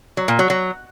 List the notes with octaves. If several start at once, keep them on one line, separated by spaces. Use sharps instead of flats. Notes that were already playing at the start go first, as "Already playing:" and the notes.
F#3
A#2
F#3
F#3